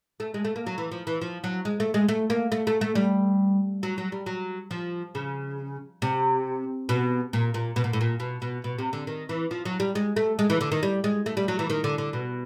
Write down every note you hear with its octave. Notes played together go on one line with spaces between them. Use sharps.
A3
G#3
A3
A#3
F#3
E3
F3
E3
F3
F#3
G#3
A3
G#3
A3
A#3
A3
A3
A3
G3
F#3
F#3
G3
F#3
F3
C#3
C3
B2
A#2
A#2
B2
A#2
A2
A#2
B2
B2
B2
C3
D3
D#3
E3
F3
F#3
G3
G#3
A3
G#3
E3
D3
D#3
G3
G#3
A3
G3
F#3
E3
D#3
D3
D3
B2